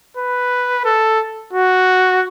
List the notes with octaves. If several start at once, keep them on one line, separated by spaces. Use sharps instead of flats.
B4
A4
F#4